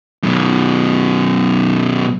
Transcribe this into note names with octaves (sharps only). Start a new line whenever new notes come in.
F#2 B2